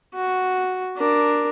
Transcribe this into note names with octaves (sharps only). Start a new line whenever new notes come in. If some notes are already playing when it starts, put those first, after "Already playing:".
F#4
D4 A#4